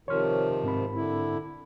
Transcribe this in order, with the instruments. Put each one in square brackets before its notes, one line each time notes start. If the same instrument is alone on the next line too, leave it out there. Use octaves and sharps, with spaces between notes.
[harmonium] C3 D#3 F3 [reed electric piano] C#5 C6 F6
[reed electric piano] G#2 C4 B5
[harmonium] D3 E4